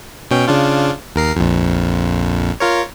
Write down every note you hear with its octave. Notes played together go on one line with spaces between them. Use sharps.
B2 C#4 G5
C#3 D4 F4
D#2 A#4 C7
A#1 F2
F4 A#4 C#5